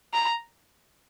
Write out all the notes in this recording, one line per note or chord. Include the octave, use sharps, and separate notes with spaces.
A#5